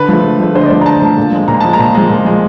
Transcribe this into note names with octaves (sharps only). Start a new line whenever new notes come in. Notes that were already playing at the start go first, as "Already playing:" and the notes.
Already playing: D3 B4
F3 A3
D3
F3 A3
D3 C5
D#5
D5
F3 A3
A#5
D3 A5
F3 A3
A#2
F3 G#3
A#2 A#5
F3 G#3 A5
A#5
A#2
F3 G#3
A#2
F3 G#3